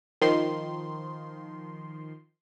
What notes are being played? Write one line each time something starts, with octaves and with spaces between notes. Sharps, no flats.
D#3 F3 C6